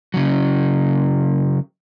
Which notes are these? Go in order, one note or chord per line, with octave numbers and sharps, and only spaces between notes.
C#3 F#3